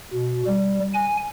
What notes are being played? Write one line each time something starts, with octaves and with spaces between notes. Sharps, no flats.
B2
G3
G#5